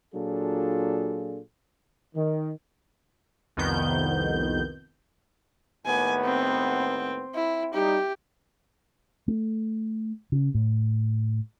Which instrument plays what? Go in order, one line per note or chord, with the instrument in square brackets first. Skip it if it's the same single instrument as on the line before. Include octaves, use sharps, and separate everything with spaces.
[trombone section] A#2 F#3 D4 F4 G#4 A4
D#3
[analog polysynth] C2 F2 D#3 B3 G6
[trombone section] D#2 A2 B3 [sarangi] G#5
[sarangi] C4
E4
[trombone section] G3 D#4 [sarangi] G4
[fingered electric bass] A3
C#3
A2